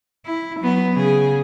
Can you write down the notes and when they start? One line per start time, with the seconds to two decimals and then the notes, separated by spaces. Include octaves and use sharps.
0.26 E4
0.60 F#3 B3
0.94 C#3 G#4